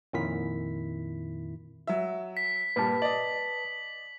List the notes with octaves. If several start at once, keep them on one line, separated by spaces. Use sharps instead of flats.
F2 A#2 D#3 E4 B6
F#3 E5
B6
G2 A#2 G3 B4 A5
D5 D#5 F#7